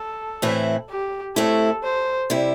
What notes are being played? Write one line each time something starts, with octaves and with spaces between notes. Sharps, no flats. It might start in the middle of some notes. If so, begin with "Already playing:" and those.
Already playing: A4
A2 E3 C4 E4
G4
A2 A3 C4 E4 A4
C5
C3 G3 E4